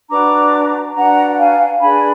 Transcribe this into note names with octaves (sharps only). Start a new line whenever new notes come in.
D4 F#4 B4 A#5 D6
D4 F#4 B4 F#5 A#5
F5 G#5
D4 G#4 B4 G#5 B5